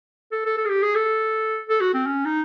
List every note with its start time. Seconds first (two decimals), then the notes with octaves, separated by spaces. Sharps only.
0.32 A4
0.46 A4
0.58 A4
0.65 G#4
0.69 G4
0.82 G#4
0.95 A4
1.69 A4
1.81 F#4
1.94 C4
2.06 C#4
2.25 D#4